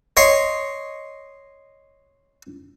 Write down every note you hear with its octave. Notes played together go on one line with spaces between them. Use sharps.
C#5 D#5 C6 C#6